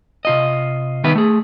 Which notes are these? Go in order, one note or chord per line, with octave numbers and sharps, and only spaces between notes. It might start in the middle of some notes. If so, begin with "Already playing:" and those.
C3 F4 D#5
C2 D#3 B3 G4 B4 E5
A3 G#4